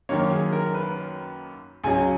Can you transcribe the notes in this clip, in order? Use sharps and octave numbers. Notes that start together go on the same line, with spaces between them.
F#2 D#3 F#3 A#3 C#5
G#4
A#4
B4
C#2 C#3 F#3 G#5